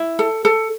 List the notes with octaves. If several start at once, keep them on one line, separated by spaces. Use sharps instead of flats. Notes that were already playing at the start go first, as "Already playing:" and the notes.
Already playing: E4
A4
A4